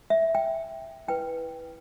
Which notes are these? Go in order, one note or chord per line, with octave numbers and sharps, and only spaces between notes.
E5
G5
E4 B4 G5